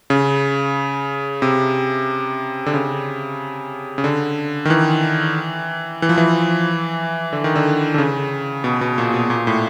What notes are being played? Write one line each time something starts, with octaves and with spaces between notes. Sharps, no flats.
C#3
C3
D3
C#3
C#3
D3
D#3
E3
E3
F3
E3
D3
D#3
D3
D3
C#3
B2
B2
A#2
B2
A#2
A2